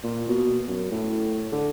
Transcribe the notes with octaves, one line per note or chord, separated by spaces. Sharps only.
A#2
B2
F#2
A2
D3